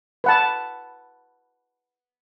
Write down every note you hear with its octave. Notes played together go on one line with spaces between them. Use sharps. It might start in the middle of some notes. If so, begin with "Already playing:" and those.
B4 F#5 A5